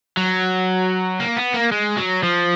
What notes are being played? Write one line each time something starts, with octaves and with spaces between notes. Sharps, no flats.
F#3
A#3
B3
A#3
G#3
F#3
F3